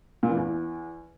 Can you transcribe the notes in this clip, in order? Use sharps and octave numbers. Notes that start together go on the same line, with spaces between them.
A#2
E3
E2